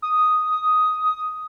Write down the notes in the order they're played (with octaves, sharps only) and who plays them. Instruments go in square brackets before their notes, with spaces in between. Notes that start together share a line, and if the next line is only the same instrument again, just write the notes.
[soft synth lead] D#6